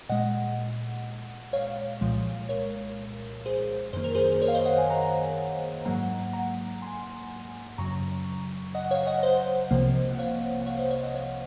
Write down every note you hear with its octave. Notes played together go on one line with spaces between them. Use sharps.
A#2 G#3 D#5 F#5
C#5 F5
C2 A#2 F3 G#3
A#4 C#5
G#4 C5
F#2 D#3 A#3 C5
A#4
G#4 C5
A#4 C#5
F5
C5 D#5
D#5 F#5
F5 G#5
F#5 A#5
G#2 F#3 A#3 F#5 A#5
F#5 A#5
G#5 C6
F#2 C#3 F#3 A#5 C#6
D#5 F#5
C#5 F5
D#5 F#5
C5 D#5
C2 C3 F3 A#3
F#5
C#5 F5
F#5
C#5 F5
C5 D#5
C#5 F5
D#5 F#5
C#5 F5